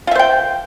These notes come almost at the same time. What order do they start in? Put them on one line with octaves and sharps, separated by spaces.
F4 E5 C5 G5